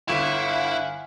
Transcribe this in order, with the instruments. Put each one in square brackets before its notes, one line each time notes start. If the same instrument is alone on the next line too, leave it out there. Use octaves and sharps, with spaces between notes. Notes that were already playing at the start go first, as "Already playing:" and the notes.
[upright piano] G1 B6 E7 [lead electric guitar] E4 [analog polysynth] F5 F#5 G#5